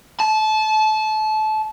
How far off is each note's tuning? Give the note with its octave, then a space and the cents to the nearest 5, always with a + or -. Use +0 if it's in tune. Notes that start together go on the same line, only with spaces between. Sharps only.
A5 -25